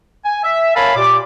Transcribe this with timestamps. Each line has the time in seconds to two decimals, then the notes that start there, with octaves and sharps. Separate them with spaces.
0.25 G#5
0.44 E5
0.75 A#4 C#5 F5 G#5 A5 B5
0.96 A#2 G4 D5 D6